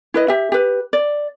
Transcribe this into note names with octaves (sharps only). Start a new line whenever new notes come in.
E4 B4 D#5
G4 E5
G4 B4
D5